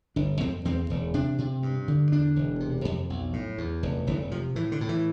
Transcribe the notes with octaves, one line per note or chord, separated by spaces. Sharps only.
G1 D4
F2 C4
E2 C4
E1
C3 D4
C3
G2
D3
E2 D4
E1
C3
F2
B1
A2
E2
F1
F1 E3
C3 F3
A2 E3
D3
A2
E3